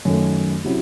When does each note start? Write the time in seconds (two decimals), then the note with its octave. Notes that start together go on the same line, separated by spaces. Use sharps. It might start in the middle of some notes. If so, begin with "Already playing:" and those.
0.05 F#2 D#3 A3
0.64 C3 F#3 C#4 E4